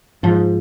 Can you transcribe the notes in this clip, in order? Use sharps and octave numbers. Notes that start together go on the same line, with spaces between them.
G#2 F3